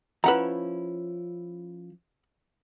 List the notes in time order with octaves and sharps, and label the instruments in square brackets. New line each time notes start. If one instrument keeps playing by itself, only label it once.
[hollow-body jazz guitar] F3 C#4 E4 [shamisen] B4 F#5 A#5